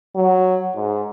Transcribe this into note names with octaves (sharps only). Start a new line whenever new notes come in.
F#3
G#2